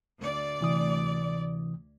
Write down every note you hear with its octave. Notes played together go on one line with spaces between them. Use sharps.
D2 D5
C3 E3 D#6